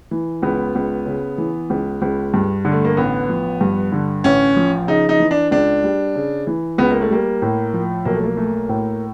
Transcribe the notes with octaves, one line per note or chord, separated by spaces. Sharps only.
E3
C#2 B3
C#2
C#3
E3
C#2
C#2
G2
D3
A3
A#3
A1 B3
F3
G2
D3
A1 C#4
F3
C#3 D#4
D#4
E3
D4
C#2 D4
G3
C#3
E3
C#2 B3
A#3
A3
G3 A#3
A2
F3
B1 A#3
A3
A#3
A3
A2